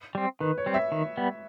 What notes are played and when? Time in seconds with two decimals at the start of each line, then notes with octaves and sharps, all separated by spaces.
0.15 G3 C4
0.40 D#3 B4
0.58 C#5
0.66 G3 C4
0.74 E5
0.92 D#3
1.17 G3 B3